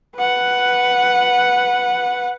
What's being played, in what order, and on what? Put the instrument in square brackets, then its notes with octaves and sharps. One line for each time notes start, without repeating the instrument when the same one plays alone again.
[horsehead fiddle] B4 F#5